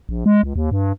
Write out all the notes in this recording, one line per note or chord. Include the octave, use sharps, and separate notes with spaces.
A#1
G#3
C#2
D#2
G2